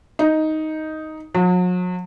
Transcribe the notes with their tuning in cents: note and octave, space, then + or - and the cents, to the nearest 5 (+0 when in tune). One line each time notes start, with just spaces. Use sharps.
D#4 +5
F#3 -40